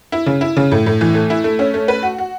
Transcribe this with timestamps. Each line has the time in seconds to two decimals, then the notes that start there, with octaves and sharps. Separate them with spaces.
0.12 E4
0.26 C#3
0.41 E4
0.57 C#3
0.72 A2
0.86 A2
1.01 E3
1.15 A3
1.30 E4
1.44 A3
1.59 C#4
1.74 A3
1.88 B4
2.02 F#4
2.18 F#4